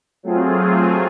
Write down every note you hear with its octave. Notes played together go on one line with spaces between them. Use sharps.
F#3 A3 C4 F4 G#4